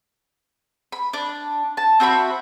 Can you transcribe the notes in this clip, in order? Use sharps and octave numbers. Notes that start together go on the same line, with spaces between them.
B5
D4
A5
C4 F#4 E5 B5